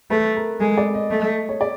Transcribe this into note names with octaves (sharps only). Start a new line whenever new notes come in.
A3 B4
A#4
G#3 A4
D5
D#5
A3
C#5
D5